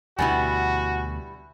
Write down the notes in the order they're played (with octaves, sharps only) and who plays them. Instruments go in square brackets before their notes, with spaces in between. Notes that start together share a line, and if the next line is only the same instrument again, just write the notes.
[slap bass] D2 B2 [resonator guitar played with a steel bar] G3 B3 E4 [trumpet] F#4 [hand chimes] G#5